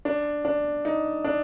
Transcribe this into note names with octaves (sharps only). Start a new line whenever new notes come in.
D4
D4
D#4
D4